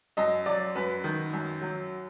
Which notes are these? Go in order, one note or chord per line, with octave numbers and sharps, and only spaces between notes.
F#2 D#5
F#3 D5
F#2 B4
D#3
F#2
F#3